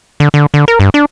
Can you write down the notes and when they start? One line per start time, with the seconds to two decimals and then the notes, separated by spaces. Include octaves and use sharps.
0.20 D3
0.34 D3
0.54 D3
0.68 A#4
0.80 G2
0.94 D4